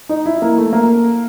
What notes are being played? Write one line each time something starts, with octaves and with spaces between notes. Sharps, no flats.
D#4
E4
A#3
A3
A#3